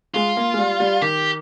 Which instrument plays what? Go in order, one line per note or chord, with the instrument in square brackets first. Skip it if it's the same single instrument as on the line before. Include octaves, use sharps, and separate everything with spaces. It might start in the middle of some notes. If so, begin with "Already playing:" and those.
[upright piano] G#3 [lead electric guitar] F4
[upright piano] A#3
G#3
G3
G3
[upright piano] D#3 [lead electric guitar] G4